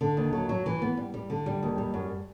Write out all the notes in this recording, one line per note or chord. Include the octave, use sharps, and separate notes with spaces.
D3
D#2
F#3
F#3
E3
B3
G3
G3
D3
G3
D#2
G3
F#2